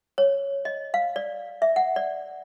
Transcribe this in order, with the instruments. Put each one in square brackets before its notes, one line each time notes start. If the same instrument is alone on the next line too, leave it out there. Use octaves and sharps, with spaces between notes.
[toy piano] C#5
D#5
F5
D5
E5
F#5
D5